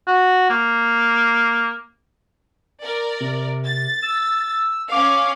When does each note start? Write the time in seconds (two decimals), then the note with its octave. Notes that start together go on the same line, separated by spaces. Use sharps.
0.08 F#4
0.50 A#3
2.84 A#4 D5
3.20 C3
3.66 A6
4.02 E6
4.92 C#4 F5 D6